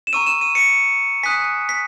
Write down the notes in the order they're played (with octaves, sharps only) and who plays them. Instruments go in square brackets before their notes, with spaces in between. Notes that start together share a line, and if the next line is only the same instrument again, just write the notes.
[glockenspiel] E7
A#5 C#6 E6 D#7
E7
D#7
C#7
G#5 D#6 F#6 B6
B6